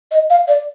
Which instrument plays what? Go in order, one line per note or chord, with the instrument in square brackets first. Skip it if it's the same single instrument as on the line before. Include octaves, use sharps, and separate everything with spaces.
[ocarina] D#5
F5
D5